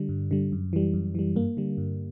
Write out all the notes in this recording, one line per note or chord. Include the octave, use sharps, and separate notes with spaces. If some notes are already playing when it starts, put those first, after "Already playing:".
Already playing: D3 G3
G2
D3 G3
F#2
E3 G3
F#2
E3 G3
G2 A#3
D3 G3
G2